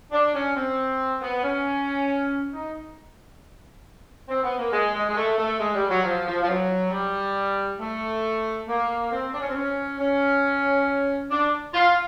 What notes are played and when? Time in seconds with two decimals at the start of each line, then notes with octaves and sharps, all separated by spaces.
0.11 D4
0.34 C#4
0.55 C4
1.21 B3
1.43 C#4
2.52 D#4
4.28 C4
4.43 B3
4.57 A#3
4.72 G#3
4.93 G#3
5.09 G#3
5.16 A3
5.38 A3
5.59 G#3
5.74 G3
5.90 F#3
6.03 F3
6.26 F3
6.41 F3
6.48 F#3
6.91 G3
7.79 A3
8.67 A#3
9.11 C4
9.32 D4
9.39 C#4
9.47 C4
9.54 C#4
9.99 C#4
11.30 D4
11.74 F4